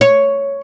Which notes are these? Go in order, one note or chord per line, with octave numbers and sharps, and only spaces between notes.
C#5